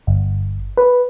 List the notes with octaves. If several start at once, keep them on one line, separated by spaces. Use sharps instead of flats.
G1
B4